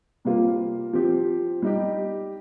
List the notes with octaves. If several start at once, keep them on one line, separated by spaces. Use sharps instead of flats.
C3 G3 A#3 F4
F3 C4 G4
G3 D#4 G4